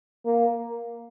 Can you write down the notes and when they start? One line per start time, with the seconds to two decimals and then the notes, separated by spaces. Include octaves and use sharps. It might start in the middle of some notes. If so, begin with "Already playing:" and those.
0.25 A#3